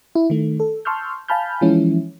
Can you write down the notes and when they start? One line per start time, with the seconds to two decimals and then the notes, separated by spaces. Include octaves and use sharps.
0.15 E4
0.30 D#3 A3
0.60 A4
0.85 A5 C6 C#6 E6 F6 G6
1.28 F5 G#5 A5 B5 F6 G6
1.61 E3 F3 G#3 C#4 E4